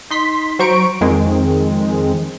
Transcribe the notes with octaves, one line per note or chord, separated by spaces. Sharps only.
D#4 C6 B6
F#3 C5 A#5 C#6 D7
F2 D#3 G#3 C4